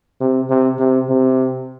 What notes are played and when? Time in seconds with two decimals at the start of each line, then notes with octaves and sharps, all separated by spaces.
0.21 C3
0.50 C3
0.79 C3
1.09 C3